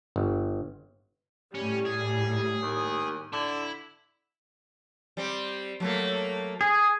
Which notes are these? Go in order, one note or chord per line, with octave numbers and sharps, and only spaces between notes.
G1
A2 G3 C#4
G#4
D#2
D3 E4
G3 C4
F#3 A3 A#3
G#4